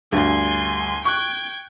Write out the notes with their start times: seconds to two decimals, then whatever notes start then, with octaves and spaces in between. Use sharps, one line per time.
0.12 D2 G2 G#5 C6
1.05 G5 C#6 F#6 G#6